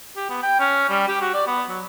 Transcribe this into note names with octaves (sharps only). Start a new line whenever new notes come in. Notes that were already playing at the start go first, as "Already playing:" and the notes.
G4
B3
G5
C#4
G3
G4
F#4
D5
B3
F#3